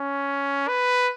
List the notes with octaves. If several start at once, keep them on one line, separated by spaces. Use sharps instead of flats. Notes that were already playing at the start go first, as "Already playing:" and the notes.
Already playing: C#4
B4